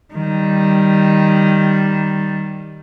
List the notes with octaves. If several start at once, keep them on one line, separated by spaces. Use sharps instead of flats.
D#3 G3